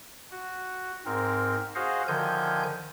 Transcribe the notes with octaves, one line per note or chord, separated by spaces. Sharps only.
F#4
G#2 C4 A#4
F#4 G#4 C5 D#5 F5 F#5
D3 D#3 F3 G#5 G6